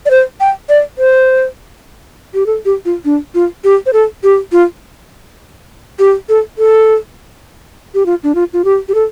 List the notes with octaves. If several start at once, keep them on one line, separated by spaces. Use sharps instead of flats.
D5
C5
G5
D5
C5
G4
A4
G4
F4
D4
F4
G4
C5
A4
G4
F4
G4
A4
A4
G4
F4
D4
F4
F4
G4
G4
A4